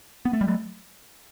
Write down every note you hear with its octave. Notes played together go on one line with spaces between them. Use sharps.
B3
A3
G3
F#3 A3